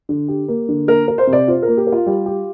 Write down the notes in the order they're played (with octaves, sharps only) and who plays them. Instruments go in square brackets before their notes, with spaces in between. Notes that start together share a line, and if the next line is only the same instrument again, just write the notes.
[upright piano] D3
G4
A#3
D3
[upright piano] A#3 [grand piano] A#4
[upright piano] A#4
[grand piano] C5
[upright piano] C3
[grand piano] D5
[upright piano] F4 [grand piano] C5
[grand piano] A#4
[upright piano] A#3
[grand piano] G4
[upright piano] A#4
[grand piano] F4
[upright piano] G3
G4